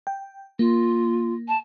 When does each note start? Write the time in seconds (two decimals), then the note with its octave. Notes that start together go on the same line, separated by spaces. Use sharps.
0.07 G5
0.59 A#3 F4
1.48 A5